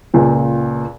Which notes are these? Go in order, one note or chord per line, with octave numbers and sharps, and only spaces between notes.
C#2 A#2